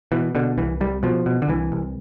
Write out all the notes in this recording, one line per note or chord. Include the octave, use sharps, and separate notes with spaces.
B2 E3
B2 D3
C2 E3
C2 G3
B2 F3
B2
D3
C2 E3
C2